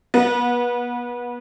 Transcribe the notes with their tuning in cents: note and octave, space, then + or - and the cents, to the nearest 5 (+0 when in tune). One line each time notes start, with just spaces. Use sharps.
B3 -30